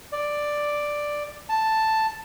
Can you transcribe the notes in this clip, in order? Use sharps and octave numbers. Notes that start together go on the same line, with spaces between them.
D5
A5